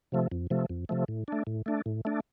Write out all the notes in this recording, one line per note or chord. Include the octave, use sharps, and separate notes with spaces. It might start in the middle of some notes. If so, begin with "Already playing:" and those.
C3 F3 A3
F2
C3 F3 A3
F2
C3 F3 A3
A2
A3 D4
A2
A3 D4
A2
A3 D4